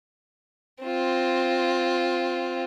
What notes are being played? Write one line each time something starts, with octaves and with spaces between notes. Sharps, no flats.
C4 F4